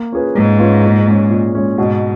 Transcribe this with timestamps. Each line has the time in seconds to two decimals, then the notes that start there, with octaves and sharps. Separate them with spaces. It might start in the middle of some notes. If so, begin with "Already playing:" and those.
Already playing: A#3
0.12 C#4 F4 G#4 B4
0.35 G#2 A#3
0.59 C#4 F4 G#4 B4
0.84 A#2
1.07 G#3 C#4
1.30 A#2
1.55 G#3 C#4
1.78 G#2 B2